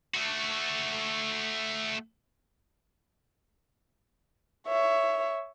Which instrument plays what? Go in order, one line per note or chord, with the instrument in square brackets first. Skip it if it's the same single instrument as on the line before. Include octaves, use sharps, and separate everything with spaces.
[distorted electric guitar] A3 F#4
[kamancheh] C#5 E5